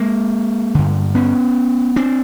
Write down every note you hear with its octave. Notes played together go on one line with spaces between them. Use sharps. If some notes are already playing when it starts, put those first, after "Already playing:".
Already playing: G#3 A#3
G2 D3
B3 C#4
C4 D4